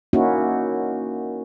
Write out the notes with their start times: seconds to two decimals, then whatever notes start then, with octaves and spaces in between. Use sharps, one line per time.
0.13 A#3 C#4 D#4 E4 F#4